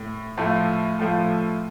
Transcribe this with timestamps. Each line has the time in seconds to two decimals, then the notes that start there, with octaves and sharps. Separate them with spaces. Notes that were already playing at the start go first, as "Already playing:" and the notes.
Already playing: A2
0.37 A2 F3 A3 F4 A4
0.99 A2 F3 A3 F4 A4